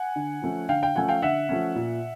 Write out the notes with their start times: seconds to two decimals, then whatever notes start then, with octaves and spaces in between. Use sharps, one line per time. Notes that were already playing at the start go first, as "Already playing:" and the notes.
Already playing: F#5 G#5
0.16 D3
0.42 F3 A3 C#4
0.69 D3 F5 G5
0.83 F5 G5
0.95 F3 A3 C#4 F#5 G#5
1.08 F5 G5
1.22 D3 E5 F#5
1.49 F3 A3 C#4
1.75 A#2